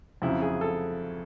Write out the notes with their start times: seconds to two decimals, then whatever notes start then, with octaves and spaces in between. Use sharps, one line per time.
0.22 F2 C#3 F#3 E4
0.42 G#4
0.61 A4